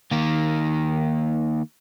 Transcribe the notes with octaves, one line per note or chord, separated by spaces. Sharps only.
D#3 A#3